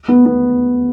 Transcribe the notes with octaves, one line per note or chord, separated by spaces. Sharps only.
B3
B3